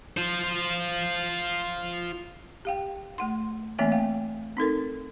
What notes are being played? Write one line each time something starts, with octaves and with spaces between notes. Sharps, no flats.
F4 C5
G4 F5 G5
A3 F#5 C6
E3 A3 A#3 C4 E5 G#5
F5 G5
C4 D#4 A4 A#4